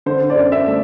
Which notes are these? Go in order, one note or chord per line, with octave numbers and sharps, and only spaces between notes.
D3 C5
D5
F#2
E5
A3